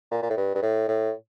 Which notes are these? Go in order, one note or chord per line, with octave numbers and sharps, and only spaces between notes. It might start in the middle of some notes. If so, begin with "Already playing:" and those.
A#2
A#2
A2
G2
G2
A2
A2